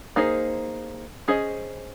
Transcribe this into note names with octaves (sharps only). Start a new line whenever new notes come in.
A#3 D#4 G#4 C5
C#4 G#4 C5 D#5